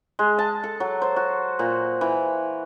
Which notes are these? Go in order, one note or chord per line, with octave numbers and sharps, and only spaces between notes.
G#3
A5
A4
F#3
C5
F#4
A#2
E3